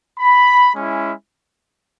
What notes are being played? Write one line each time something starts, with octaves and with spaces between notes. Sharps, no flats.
B5
G#3 C#4 E4